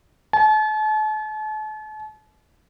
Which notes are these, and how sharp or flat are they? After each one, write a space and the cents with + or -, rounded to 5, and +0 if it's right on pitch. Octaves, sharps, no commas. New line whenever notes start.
A5 -40